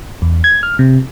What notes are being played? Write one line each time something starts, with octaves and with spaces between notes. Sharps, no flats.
E2
G#6
F6
C3